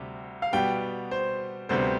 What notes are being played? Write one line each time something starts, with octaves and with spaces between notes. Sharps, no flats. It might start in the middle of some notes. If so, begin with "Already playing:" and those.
Already playing: D2 C3 G3
F5
B2 G3 B3 G5
C5
D2 C3 G3 B3 C5